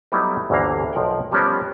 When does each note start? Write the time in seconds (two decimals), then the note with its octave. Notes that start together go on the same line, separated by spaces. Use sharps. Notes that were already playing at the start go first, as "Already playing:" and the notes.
0.12 F#3 G3 A3 B3 D#4 E4
0.50 G1 D2 E3 A#3 F5
0.93 B1 F3 A#4 F#5 G5
1.31 F3 G3 B3 C#4 A#4 C5